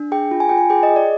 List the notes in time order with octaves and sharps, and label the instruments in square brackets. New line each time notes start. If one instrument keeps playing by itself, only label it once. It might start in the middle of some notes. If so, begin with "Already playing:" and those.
Already playing: [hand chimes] D4
G#4 G5
F4
G#5
F4 G5
G#5
G#4 G5
D#5
G#4
D5